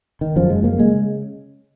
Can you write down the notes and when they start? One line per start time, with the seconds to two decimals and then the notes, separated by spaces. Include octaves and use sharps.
0.21 D#3
0.36 F#1 F#2 C#3 F3
0.50 G#3
0.64 A#3
0.80 C#3 G#3